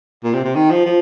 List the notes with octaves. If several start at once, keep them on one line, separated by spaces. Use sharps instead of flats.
A#2
C3
C3
D#3
F3
F3